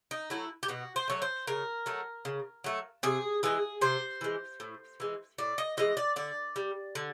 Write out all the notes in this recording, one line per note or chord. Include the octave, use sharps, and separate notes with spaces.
D#4
F#3 A3 E4
G4
B2 F#4
C5
F#3 A3 C#5
C5
C#3 A#4
F#3 A3
C#3
F#3 A3
C3 G#4
E3 G#3 G#4
C3 C5
E3 G#3
A2
E3 G#3
A2 D5
D#5
E3 G#3 D#5
D5
D3 D5
G3
D3